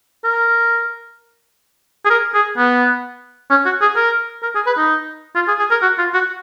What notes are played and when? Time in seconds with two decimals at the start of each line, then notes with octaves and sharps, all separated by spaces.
0.24 A#4
2.05 G#4
2.10 A#4
2.34 G#4
2.57 B3
3.50 C#4
3.66 F#4
3.81 G#4
3.96 A#4
4.43 A#4
4.55 G#4
4.67 B4
4.77 D#4
5.35 F4
5.48 G#4
5.59 G#4
5.71 A#4
5.82 F#4
5.98 F4
6.14 F#4